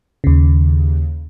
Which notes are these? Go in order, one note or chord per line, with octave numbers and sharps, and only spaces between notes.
D#2 C#3